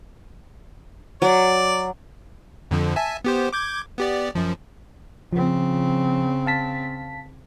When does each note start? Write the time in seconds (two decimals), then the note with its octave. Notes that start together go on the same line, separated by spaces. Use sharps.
1.22 F#3 D5
2.71 F2 D3 F3
2.96 E5 G#5 A5
3.25 B3 G4 C5
3.53 D6 G6 G#6
3.98 B3 G4 D5
4.35 F#2 F3
5.33 C#3 F3 C4
6.46 F5 A5 B6